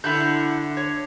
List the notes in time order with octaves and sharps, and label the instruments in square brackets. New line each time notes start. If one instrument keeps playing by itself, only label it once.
[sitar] D3 [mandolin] E4 F#5 G6
[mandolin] C#5